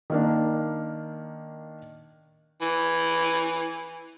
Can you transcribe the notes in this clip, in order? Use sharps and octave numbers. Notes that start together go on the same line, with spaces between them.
D#3 A#3 D4
E3